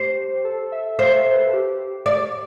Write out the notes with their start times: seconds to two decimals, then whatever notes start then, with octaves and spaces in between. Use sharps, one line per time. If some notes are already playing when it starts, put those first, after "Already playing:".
Already playing: G4 C5
0.45 A4
0.72 E5
0.99 C5 F5
1.12 E5
1.33 B4
1.39 A4
1.53 G4
2.06 D5